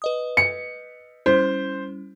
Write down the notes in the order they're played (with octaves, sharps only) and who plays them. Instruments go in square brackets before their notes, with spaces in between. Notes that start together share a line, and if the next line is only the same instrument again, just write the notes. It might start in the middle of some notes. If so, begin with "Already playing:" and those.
[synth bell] B4 D#5 D#6
[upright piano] C#7
[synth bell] G3 C#4 E4 [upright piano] C5